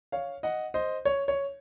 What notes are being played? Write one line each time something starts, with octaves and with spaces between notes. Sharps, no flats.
C#5 F5
D#5 F#5
C5 D#5
C#5
C#5